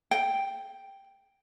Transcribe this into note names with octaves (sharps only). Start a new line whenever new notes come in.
G5